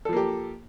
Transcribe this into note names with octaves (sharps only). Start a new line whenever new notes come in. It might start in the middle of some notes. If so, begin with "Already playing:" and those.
F3 A#3 G4 A4